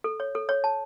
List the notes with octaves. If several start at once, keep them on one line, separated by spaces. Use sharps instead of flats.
A4
C#5
A4
C#5
A5